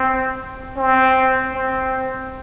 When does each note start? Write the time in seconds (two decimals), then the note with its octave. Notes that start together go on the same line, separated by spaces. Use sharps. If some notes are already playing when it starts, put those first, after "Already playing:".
Already playing: C4
0.77 C4
1.54 C4